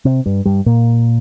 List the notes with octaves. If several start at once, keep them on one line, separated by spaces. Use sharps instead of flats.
C3 C4
G2 G3
G2 G3
A#2 A#3